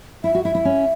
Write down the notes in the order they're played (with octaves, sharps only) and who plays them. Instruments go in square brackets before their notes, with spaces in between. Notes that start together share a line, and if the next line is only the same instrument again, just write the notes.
[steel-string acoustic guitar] E4 [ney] E5
[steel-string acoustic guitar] F#4
[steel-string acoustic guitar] E4 [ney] E5
[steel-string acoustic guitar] E4
C#4